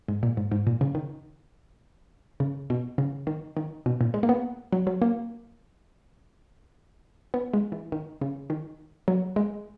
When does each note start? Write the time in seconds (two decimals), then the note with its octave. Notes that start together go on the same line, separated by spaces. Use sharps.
0.08 G#2
0.23 A#2
0.37 G#2
0.51 G#2
0.67 A#2
0.81 C#3
0.95 D#3
2.40 C#3
2.70 B2
2.98 C#3
3.27 D#3
3.57 D#3
3.86 B2
4.01 A#2
4.14 G#3
4.23 A#3
4.29 B3
4.72 F#3
4.87 F#3
5.02 A#3
7.34 B3
7.53 G#3
7.72 E3
7.92 D#3
8.21 C#3
8.50 D#3
9.08 F#3
9.36 G#3